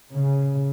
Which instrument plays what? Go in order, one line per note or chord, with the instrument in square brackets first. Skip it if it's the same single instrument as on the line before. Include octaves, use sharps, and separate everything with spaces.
[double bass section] C#3